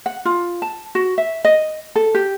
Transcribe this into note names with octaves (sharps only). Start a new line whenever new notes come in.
F#5
F4
A5
F#4
E5
D#5
A4
G4